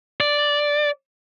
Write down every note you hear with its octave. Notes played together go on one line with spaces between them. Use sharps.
D5